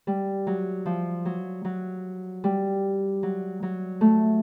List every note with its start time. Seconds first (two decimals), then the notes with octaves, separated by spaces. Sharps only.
0.07 G3
0.47 F#3
0.86 F3
1.25 F#3
1.65 F#3
2.44 G3
3.23 F#3
3.63 F#3
4.01 A3